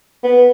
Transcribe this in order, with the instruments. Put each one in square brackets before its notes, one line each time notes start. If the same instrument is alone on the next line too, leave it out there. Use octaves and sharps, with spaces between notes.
[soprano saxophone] B3